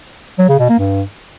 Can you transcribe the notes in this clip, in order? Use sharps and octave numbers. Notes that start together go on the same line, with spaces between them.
F#3
C#3
B2
A#3
G2